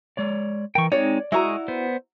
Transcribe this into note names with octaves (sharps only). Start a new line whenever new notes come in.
G#3 C#5 D5
E3 A#4 G5 C#6
G#3 C4 D#4 C#5 D5
G#3 E4 F#4 A#5 C#6 D#6
B3 C5